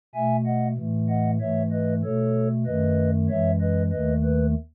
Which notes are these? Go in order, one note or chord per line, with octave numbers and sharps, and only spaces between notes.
B2 A3 E5 G#5
D#5 F#5
A2 E3 A3
D#5 F#5
G#2 E3 A3 C#5 E5
B4 D#5
B2 A3 A4 C#5
F#2 D#3 A3 B4 D#5
F#2 E3 G#3 C#5 E5
B4 D#5
D#2 D#3 A3 B4 D#5
B4